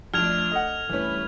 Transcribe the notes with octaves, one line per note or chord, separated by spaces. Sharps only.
F2 F3 A3 D4 D5 F6 G#6 F7
A4 D#5 F#5
G2 E3 A3 C#4 B4